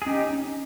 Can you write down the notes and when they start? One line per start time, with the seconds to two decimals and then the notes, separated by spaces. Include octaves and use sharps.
0.02 G#4
0.06 C#4 D#4 G4
0.29 C#4